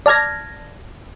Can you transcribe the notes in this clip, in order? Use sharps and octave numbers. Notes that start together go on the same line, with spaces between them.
D5 A5 F6 G#6 A#6